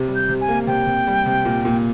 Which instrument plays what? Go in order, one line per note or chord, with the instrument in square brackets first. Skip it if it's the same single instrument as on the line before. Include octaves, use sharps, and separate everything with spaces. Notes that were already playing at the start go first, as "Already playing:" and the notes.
Already playing: [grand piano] C3
G3
[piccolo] G6
[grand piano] C3
[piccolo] G#5
[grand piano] A#3
[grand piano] C3 [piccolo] G5
[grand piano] C3
G3
C3
A#2
A#2